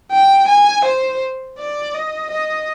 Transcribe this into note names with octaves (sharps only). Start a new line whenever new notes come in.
G5
G#5
C5
D5
D#5
D#5